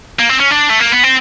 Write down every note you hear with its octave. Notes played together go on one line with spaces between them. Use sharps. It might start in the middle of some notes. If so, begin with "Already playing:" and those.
A#3
C4
C#4
D4
A3
A#3
B3
C4